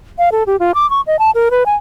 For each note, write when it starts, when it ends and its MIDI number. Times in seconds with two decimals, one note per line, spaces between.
0.19 0.29 77
0.32 0.43 69
0.47 0.56 67
0.60 0.72 65
0.75 0.89 86
0.90 1.01 85
1.07 1.19 75
1.19 1.31 81
1.35 1.49 70
1.51 1.64 71
1.66 1.75 80